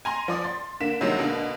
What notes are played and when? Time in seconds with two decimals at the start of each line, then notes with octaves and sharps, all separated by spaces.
0.05 G#5 A#5 C6
0.28 F3 D5 D#6
0.44 C6 A6
0.81 D3 A#3 B6 E7
1.00 G2 C3 D#3 F#3 G#3
1.19 B2 D3 A#3